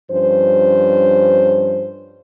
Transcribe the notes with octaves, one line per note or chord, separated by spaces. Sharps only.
G2 F3 C#4 C5